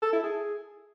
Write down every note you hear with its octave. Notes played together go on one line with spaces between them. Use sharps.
A4
E4
G#4